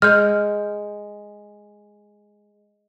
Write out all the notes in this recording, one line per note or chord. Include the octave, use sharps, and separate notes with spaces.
G#3 F6 G6